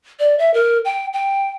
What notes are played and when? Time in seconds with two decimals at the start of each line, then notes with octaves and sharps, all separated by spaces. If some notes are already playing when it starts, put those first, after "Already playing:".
0.20 D5
0.39 E5
0.54 A#4
0.85 G5
1.13 G5